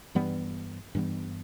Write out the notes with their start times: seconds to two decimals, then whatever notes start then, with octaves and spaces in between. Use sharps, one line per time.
0.15 G2 E3 G3 B3
0.95 G2 E3 G3 B3